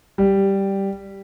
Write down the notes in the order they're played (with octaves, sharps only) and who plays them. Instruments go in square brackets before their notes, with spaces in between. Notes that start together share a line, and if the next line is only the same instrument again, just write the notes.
[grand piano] G3